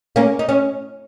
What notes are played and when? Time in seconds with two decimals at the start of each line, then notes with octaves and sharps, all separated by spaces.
0.16 A#3 C#4
0.39 D#4
0.49 C#4